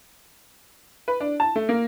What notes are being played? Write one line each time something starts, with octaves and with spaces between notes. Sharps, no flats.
B4
D4
A5
A3
A#3